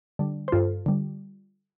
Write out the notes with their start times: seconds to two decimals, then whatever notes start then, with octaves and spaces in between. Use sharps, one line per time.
0.19 D3 G3
0.48 C5
0.52 G2 F4 A4
0.86 D3 G3